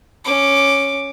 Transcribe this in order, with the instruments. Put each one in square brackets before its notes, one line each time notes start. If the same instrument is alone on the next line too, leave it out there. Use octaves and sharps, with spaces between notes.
[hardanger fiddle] C#4 D6